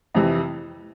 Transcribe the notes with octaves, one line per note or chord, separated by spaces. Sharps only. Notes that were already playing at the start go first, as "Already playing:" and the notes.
F2 C3 E3